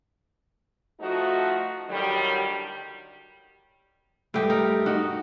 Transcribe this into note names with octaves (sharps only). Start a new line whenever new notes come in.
F3 A3 D#4 F#4
A2 D3 D#3 F#3 G3
G2 A3 G4 D#5
D#4 A#4
D#4 F#4